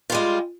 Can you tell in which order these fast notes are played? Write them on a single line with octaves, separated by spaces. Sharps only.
F4 G3 G#3